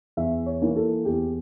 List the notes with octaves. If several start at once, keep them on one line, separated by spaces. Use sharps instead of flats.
E2 E5
C#5
E3 A#3
A4
E2 G4